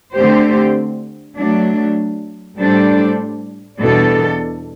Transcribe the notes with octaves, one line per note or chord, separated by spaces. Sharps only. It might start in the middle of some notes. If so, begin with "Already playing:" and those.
D3 A3 C4 G4 C5
F#3 A3 D4
A2 G3 D4 A4 C5
E2 B2 G3 D4 A4